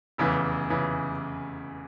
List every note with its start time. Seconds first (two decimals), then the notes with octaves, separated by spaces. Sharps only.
0.18 F1 E2 C#3 E3
0.70 C#3 E3